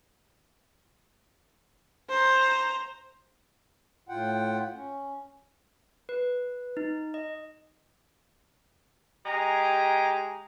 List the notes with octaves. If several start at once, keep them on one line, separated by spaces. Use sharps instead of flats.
C5 A#5
A2 F4 F#5 G5
C#4
B4
D#4
D#5
G#3 G4 D#5 G#5 A#5